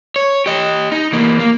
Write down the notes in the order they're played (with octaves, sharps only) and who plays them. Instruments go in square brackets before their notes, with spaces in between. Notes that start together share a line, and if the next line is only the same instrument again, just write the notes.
[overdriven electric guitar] C#5
G4 D#5
D#4
E3 A#3
A#3